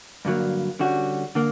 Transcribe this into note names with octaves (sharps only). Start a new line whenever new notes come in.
G2 D3 F#3 A#3
D3 G3 C#4 F#4
D3 A#3